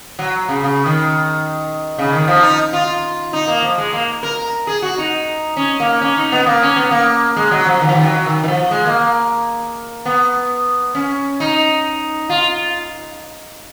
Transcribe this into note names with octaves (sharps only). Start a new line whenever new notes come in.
F#3
C#3
C#3
D#3
C#3
D#3
F3
D#4
F4
D#4
A#3
F3
G#3
A#3
A#4
G#4
F#4
D#4
C#4
A#3
C#4
D#4
B3
A#3
C#4
B3
A#3
G#3
F#3
F3
D#3
F3
D#3
F#3
D#3
D#3
F3
G#3
A#3
A#3
B3
C#4
D#4
F4